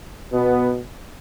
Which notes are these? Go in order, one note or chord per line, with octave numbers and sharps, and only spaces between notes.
B2 B3